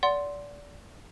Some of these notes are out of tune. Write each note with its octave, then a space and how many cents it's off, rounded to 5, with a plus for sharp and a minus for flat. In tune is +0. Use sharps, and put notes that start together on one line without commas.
D5 -25 F#5 +0 C6 +0